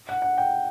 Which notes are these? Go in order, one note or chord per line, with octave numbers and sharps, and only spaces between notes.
F#5
F#5
G5